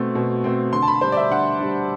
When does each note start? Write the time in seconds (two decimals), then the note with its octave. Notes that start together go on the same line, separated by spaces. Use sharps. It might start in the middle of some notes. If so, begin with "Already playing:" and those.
Already playing: B2 A3 C4
0.15 B2
0.44 A3 C4
0.73 D3 C6
0.82 A5
0.88 B5
1.01 G3 D4 C5
1.12 D5
1.17 E5
1.30 D3 F#5
1.61 G3 D4